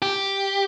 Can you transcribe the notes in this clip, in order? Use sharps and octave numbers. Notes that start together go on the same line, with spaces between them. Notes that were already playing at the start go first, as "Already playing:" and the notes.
G4